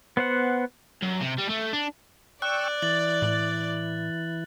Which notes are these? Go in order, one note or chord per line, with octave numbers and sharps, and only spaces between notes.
B3 C5 F#5
F#2
C3
G3
A3
D4
D5 G5 C#6 E6 F#6
E3 A6 F#7
A2